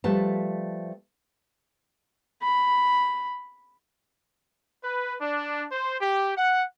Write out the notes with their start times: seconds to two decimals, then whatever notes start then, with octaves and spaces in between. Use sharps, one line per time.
0.04 F3 G3 A3 B4 A5
2.42 B5
4.84 B4
5.21 D4
5.72 C5
6.01 G4
6.37 F#5